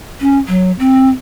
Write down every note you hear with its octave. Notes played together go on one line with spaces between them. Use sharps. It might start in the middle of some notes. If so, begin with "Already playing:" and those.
C#4
F#3
C4